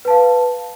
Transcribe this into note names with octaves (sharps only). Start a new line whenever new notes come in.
B4 F5 A5